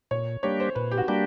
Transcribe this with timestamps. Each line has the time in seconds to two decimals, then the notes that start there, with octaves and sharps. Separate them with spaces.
0.11 A#2 C#5
0.43 G3 A#3 D4 G4 C#5
0.60 C5
0.75 A#2 B4
0.91 G4
0.98 F#4
1.08 G3 A#3 D4 G4